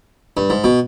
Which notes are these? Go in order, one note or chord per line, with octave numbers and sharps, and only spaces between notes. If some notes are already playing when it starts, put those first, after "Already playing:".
G2
G#2
B2